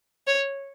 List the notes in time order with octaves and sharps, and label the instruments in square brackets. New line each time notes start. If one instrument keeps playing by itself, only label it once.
[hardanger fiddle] C#5